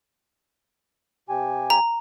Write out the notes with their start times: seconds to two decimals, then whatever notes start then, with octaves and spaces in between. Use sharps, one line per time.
1.29 C3 G4 G#5
1.70 A#5